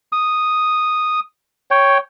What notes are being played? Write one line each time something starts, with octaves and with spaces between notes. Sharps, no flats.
D#6
C#5 G5